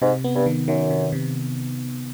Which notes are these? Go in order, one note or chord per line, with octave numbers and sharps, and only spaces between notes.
G#2 C3
B3
G2
D#3
F#2 D#3
C3
C3